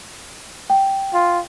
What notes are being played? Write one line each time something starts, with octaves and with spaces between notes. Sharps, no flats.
G5
F4